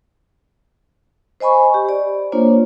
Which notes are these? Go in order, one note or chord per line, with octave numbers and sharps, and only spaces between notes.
C5 D#5 G#5 B5 C#6
G4
D5
A#3 D4 F4 C5 C#5